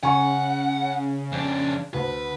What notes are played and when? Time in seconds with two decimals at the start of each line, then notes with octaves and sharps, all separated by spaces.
0.03 C#3 F#5 G#5 C#6
1.32 F2 D4
1.94 D2 B4